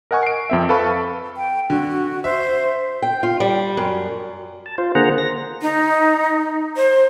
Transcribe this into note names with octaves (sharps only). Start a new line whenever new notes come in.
A#4 D#5 F#5 G#5 C#6
C7 D7
F2 C4 E5
A4 B4 F5 A5 B5 C#6
G5
D3 F#4
C5 E5
G5
F4
G3
F#2
A5
F4 C5
D3 A#3 G#4 C5 F#5 A#5
A#6
D#4
C5